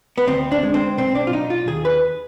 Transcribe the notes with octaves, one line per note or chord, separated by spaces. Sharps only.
B3
D2 C4
D4
G#3
C4
B1 C4
D4
F4
B1 D#4
F4
D#2 G#4
B4